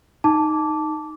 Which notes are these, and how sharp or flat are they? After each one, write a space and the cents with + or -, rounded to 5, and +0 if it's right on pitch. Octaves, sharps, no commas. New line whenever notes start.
D#4 +0 A5 +0 D6 -15